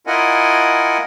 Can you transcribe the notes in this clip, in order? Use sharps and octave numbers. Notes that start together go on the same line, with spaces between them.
E4 F4 A#4 D#5 F#5 G#5